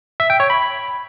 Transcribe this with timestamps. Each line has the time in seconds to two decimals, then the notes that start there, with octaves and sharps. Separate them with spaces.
0.20 E5
0.30 G5
0.40 C#5
0.50 B5